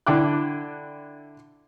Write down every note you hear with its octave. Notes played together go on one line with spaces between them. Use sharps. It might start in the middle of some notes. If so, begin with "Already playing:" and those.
D3 D4 E4 G5 D6 F#6